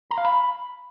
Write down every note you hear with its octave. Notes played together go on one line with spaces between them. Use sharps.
A#5
F5
B5